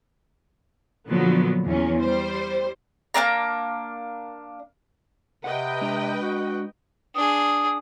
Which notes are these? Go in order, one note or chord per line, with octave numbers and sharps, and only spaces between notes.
A#2 D3 F3 F#3 B3
E2 C#4
G3 C5
A#3 C4 D4 A#5
C3 B4 D#5 F#5 G5
G#3 D4 A#5
F#4
D4 G#4 D#6